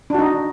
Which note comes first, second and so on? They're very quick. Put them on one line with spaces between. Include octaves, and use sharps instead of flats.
D4 F#4 D#4